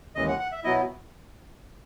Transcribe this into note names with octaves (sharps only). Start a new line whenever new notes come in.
D#2 C#3 E3 G#3 D#5
F#5
F#5
E5
B2 F#3 B3 E4 D#5